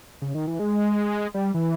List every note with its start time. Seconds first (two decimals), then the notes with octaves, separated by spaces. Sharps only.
0.22 C#3
0.35 D#3
0.47 E3
0.59 G#3
1.34 G3
1.54 E3